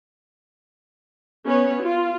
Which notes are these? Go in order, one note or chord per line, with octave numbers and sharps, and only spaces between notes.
B3 C#4 B4 C#5
F4